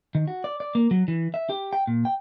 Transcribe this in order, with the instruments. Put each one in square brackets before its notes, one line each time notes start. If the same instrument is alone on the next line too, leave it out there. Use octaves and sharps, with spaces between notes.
[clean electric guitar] D#3
F#4
D5
D5
A#3
F#3
E3
E5
G4
G5
A#2
G5